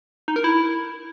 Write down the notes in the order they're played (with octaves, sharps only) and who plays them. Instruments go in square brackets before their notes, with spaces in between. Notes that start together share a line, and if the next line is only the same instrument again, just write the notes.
[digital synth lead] D#4
A#4
E4